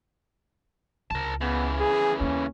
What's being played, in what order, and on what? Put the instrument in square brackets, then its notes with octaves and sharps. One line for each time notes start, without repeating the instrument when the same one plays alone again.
[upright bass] C#2 [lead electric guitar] A#4 A5
[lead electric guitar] C#3 E3 [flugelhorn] B3
[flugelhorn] G#4
[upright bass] D#2 A#3 [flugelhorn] C#4